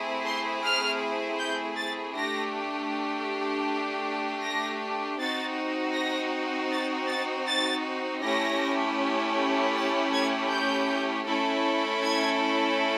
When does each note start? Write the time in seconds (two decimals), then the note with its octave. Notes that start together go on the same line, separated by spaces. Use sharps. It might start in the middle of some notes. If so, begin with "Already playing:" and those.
Already playing: A3 C4 E4 G#4
0.26 C6
0.63 F6
1.39 G6
1.77 A6
2.16 A3 D4 G4 A#6
4.43 A#6
5.19 C4 D#4 F#4 A6
5.94 A#6
6.71 A6
7.08 A6
7.47 A6
8.22 A3 C#4 E4 G4 A#6
9.75 A6
10.13 G#6
10.51 G6
11.26 A3 C#4 E4 A4
12.02 G#6